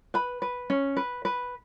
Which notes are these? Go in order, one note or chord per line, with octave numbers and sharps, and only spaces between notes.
B4 B5
B4
C#4
B4
B4